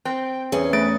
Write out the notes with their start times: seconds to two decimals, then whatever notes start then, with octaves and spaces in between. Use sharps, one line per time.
0.05 C4 G5
0.52 E2 C#4 G#4
0.73 A3 B4 A6 D7